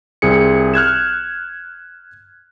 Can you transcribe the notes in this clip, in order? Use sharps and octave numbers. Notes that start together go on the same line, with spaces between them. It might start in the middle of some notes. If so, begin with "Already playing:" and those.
C2 C4 G#4 C#7
F6 F#6 G#6 E7